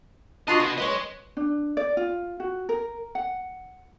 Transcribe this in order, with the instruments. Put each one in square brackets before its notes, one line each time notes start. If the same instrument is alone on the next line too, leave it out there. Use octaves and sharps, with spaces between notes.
[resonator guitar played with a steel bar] D4 F4 F#4 [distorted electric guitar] D#5
[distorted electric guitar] B2 [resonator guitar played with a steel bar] B3
[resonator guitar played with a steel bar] B4 C#5 [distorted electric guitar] D#5 C6
[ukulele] D4
D5
F4
F#4
A#4
F#5